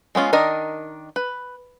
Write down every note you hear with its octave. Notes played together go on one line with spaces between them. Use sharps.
G#3 B3 C#4 F4
D#3 D4 A#4 D#5 A#5
B4